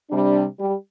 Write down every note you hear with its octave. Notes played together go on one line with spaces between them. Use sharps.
C3 G3 D4
G3 G4